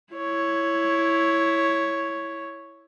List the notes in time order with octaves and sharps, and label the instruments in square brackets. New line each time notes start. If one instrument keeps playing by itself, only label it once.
[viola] E4 C#5